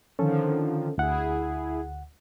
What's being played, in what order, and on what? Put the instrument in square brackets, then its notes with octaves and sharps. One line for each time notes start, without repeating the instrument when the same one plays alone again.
[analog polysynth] D3 D#3 F3 [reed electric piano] C#4 A4
[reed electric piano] D2 F#5 [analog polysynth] E4 G#4